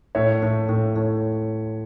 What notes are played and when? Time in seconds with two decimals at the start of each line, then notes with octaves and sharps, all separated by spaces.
0.15 A2 C#5 E5
0.42 A2
0.69 A2
0.96 A2